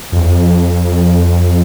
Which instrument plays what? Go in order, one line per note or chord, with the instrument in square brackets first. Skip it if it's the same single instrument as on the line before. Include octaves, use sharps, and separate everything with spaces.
[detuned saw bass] F2
E2
F2